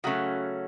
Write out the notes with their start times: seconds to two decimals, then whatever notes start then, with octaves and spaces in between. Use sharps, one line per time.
0.04 C#3 F#3 A3 C#4 F#4